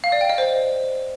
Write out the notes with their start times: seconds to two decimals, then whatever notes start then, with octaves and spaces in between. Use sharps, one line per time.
0.04 F5
0.12 D5
0.21 G5
0.30 D#5
0.38 C5